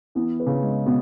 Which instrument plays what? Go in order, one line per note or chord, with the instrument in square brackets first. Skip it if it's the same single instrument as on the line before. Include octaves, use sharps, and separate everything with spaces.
[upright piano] E3 [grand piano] B3
[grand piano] B4
[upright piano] C#3
[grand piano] G#3
[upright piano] B2 [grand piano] B3